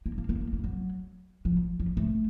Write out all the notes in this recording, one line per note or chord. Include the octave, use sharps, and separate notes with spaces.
A#3
A#3
A#3
A#3
A#3
F#3
F3
F3
A3